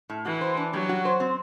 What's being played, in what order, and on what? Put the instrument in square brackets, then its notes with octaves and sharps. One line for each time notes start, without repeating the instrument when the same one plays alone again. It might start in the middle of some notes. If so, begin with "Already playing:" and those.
[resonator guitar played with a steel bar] A2
[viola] E3 [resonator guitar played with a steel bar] F#4
[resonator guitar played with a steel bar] C5
D4
[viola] F#3 [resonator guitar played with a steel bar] G3
[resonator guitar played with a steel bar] F#4
C5
C4